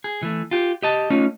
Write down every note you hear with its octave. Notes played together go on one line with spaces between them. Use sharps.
G#4
E3 A3
F4 G4
G4 D#5 A5
A3 C#4 D#4 F4